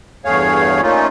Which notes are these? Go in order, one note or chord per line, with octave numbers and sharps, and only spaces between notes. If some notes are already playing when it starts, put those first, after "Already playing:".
E2 G2 A3 G#4 C#5 F5
A#2 A3 A#3 C#4 D#4 F4